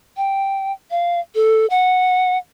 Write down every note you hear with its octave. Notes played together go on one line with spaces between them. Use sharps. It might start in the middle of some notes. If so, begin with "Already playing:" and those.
G5
F5
A4
F#5